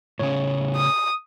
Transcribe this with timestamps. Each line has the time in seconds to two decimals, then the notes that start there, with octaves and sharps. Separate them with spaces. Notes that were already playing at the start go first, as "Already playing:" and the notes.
0.19 A2 C#3 C#4 C#5
0.77 D#6